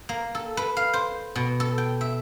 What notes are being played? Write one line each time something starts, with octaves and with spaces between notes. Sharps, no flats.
A#3
A4
B4
F5
C5
B2
A4
G5
E5